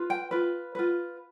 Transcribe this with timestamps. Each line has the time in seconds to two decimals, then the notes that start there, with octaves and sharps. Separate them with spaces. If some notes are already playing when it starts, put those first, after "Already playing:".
Already playing: F4 B4
0.10 G5
0.31 F4 B4
0.75 F4 B4